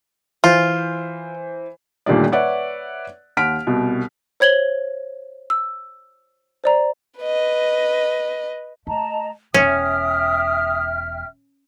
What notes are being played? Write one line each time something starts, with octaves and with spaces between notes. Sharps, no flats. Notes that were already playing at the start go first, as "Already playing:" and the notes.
E3 F4 C5
D#1 D2 A#2 D#3 G3 D5
B4 C#5 D5 E5 F#5
D#2 F#5 F6 B6 D7
C2 B2
C5 C#5 G#6 F#7 G7
E6
C5 D5 A#5
B4 D#5
A3 D#5 A5 A#5
E1 E2 C#4 E5 G5 D#6 F6